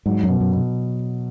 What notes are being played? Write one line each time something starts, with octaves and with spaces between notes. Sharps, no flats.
G#2 F#3
F#2
B2
F#2
B2